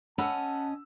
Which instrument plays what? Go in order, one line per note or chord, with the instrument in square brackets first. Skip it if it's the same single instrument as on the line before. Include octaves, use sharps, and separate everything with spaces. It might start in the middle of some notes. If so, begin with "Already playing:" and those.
[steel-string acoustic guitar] C#4 D#5 [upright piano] F#5 B5 E6 [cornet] A5